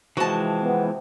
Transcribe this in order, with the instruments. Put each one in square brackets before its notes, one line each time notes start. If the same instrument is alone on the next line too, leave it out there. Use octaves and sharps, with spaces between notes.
[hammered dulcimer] C3 F#5 [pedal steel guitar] E3 F3 G#3 [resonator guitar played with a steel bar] F#4 A5
[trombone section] B3